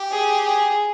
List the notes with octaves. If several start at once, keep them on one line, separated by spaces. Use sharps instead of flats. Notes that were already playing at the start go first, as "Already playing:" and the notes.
Already playing: G4
G#4
G#4